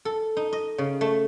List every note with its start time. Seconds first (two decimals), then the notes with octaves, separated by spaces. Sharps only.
0.05 A4
0.37 D#4
0.53 D#5
0.78 C#3
1.01 A3